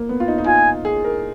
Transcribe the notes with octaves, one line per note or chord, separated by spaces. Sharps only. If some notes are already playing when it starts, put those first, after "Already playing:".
Already playing: A#3
B3
F4
D#4
D#4
F4 G#5
G#4
A#4